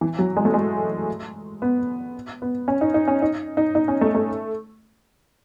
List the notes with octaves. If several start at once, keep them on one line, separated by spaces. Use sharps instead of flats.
E3
F#3
G#3
A3
G#3
B3
B3
C#4
D#4
D#4
C#4
D#4
D#4
D#4
C#4
A3
A3